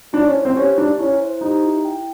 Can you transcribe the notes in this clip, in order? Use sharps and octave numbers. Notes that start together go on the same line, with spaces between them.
D4 E4
C#4
C5
C4
C#4 G4
D4 E4
C#4 E4
C5
D#4 G4
E4
G5